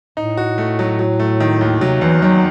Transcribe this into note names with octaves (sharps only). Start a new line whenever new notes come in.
A2 D#4
F#4
A3
F#3
F#3
A3
D#3
D#2
C3 F#3
E2 E3
D#3 F#3